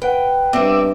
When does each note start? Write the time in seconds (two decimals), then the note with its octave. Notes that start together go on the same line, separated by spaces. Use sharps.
0.02 B4 F#5 G5
0.53 G2 C4 D#4 D5 E5